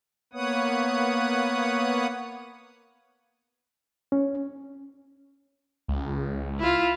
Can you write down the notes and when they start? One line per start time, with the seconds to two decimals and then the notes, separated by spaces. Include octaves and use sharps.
0.33 A#3 B3 B4 C#5 F#5 D#6
4.12 C#4
5.88 C#2
6.60 E4 F4